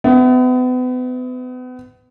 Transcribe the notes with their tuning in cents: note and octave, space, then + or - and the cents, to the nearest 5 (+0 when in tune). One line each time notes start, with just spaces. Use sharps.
B3 +35 E5 +0